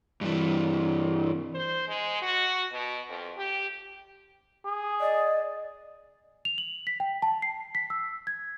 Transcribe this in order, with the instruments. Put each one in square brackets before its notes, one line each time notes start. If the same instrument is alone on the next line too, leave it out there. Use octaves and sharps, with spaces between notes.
[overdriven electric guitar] G2 E3
[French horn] C5
G#3
F#4
B2
F2
G4
[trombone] G#4
[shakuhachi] D5 [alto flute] D#5
[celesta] F7
F#7
B6
G5
A5
C7
B6
E6
G#6